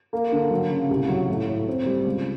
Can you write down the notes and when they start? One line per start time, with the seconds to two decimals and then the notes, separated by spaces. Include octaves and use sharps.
0.13 A#3
0.32 D3
0.51 F#3
0.70 C#3
0.90 C2
1.09 F#3
1.29 A2
1.48 A2
1.68 C4
1.86 G3
2.06 C#2